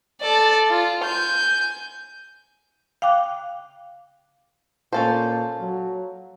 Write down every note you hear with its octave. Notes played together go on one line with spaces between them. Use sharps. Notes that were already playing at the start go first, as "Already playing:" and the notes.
A4 D5
F4
G#5 G6
F5 G5 D6 F#6
A#2 C#4 A4 C5 F5 A5
F#3